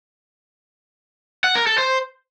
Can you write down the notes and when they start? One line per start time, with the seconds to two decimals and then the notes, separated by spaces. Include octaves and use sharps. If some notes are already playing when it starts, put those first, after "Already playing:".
1.44 F#5
1.55 A#4
1.67 A4
1.78 C5